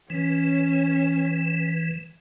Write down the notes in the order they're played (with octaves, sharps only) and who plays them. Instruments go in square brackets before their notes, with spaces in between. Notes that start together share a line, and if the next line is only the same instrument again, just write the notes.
[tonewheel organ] E3 [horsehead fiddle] C#4